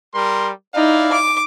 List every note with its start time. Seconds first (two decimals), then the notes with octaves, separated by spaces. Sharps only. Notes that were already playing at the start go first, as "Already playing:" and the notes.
0.14 G3 A#4 C6
0.75 D#4 E4 D5 F5
1.12 D6